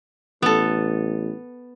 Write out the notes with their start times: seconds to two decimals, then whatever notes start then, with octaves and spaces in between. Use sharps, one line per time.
0.42 A1 B3 A4